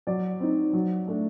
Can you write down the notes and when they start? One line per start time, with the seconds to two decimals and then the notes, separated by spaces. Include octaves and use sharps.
0.07 F#3 D5
0.40 C4 D#4
0.73 F#3
1.08 A3 D4